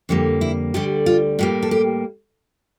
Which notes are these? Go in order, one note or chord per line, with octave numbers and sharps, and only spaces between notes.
F2 D3 G3 A#3
E4
D2 D3 G3 G4
F4
A2 G3 A#3 F4
A4
G4